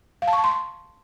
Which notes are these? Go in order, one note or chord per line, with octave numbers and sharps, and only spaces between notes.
F5
A5
C#6
A5
C6